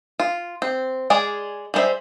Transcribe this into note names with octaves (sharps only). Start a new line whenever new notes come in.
F4
C4
G#3 G#4 D5
G3 G#3 D#4 C5 E5